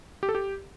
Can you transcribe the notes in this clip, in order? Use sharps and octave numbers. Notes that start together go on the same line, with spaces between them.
G4
A4
G4